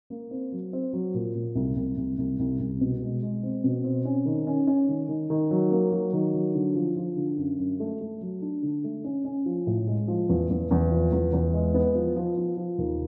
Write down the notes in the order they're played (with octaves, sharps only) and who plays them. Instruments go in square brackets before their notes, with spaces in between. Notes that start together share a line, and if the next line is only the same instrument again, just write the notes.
[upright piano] A#3
C4
F#3
C4
F#3
A#2
A#2
C2
C2
C2
C2
C2
C2
B2
G#3
G#3
C4
B2
C4
C#4
D#3
C#4
C#4
D#3
D#3
D#3
F#3
A#3
F#3
D#3
F#3
D3
F3
F3
D3
F#2
F#2
A3
A3
F#3
D4
D3
A3
C#4
C#4
F3
A2
G#3
F3
E2
E2
E2
F3
E2
E2
G#3
B3
F3
F3
F3
F3
D#2